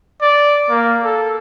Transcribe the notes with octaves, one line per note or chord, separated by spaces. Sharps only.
D5
A#3
A4